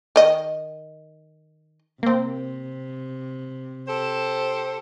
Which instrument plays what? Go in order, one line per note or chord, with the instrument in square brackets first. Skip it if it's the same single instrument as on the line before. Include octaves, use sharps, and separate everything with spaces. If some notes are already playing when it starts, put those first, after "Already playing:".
[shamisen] D#3 D#5
[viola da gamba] C3 [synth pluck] A#3 C4
[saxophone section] G4 A4 C5